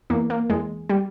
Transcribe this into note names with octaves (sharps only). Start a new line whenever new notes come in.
E2 A#3
A#3
E2 G#3
G3